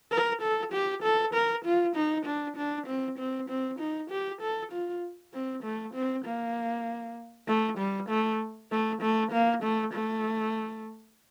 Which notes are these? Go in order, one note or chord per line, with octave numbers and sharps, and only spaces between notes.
A#4
A4
G4
A4
A#4
F4
D#4
D4
D4
C4
C4
C4
D#4
G4
A4
F4
C4
A3
C4
A#3
A3
G3
A3
A3
A3
A#3
A3
A3